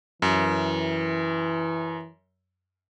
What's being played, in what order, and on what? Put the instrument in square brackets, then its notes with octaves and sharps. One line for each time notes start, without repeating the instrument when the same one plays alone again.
[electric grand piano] F#2 [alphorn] E3